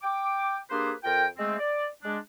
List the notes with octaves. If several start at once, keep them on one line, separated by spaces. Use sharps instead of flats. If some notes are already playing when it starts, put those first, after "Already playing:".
G5 D6
A#3 D4 G4 G#4 B4 C5
F2 F4 A#4 G5
G#3 A3 C4
D5
G#3 D4